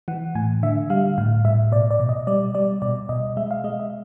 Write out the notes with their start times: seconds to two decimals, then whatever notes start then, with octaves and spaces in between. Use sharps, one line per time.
0.08 E3 F#5
0.35 A2 G#5
0.63 D3 E5
0.90 G3 F5
1.18 A2 F5
1.45 A2 E5
1.72 B2 D5
1.91 D5
1.99 B2
2.09 D#5
2.27 G3 D5
2.55 G3 D5
2.82 B2 D5
3.09 B2 D#5
3.37 G#3 E5
3.51 F5
3.64 G#3 D#5
3.80 E5